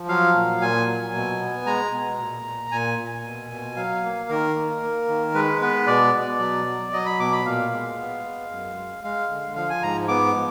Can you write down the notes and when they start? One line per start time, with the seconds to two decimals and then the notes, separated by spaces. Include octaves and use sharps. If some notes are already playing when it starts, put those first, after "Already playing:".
Already playing: F3
0.09 F#3 F5
0.35 A#2
0.61 A#2 G#5
0.87 F#3
1.14 B2
1.40 B3
1.66 G#3 A#5
1.93 B2
2.19 A#2
2.45 A#2
2.71 A#2 G#5
2.99 A#2
3.25 B2
3.51 B2
3.76 F#3 F5
4.03 A#3
4.29 D#3 A#4
4.56 A#3
4.82 A#3
5.08 D#3
5.34 G#3 B4
5.62 B3 B4
5.87 B2 D5
6.14 B2
6.40 F#3
6.66 F#3
6.93 F#3 D#5
7.06 B5
7.19 B2 D6
7.32 B5
7.45 A#2 F5
7.72 G#3
7.98 B3
8.25 G#3
8.51 F#2
8.77 G#3
9.04 G#3 F5
9.30 D3
9.56 F3 F5
9.69 G#5
9.83 G#2 A#5
10.08 B3 D6
10.36 F3